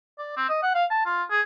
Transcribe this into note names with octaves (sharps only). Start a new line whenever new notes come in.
D5
C4
D#5
F#5
F5
A5
F4
G#4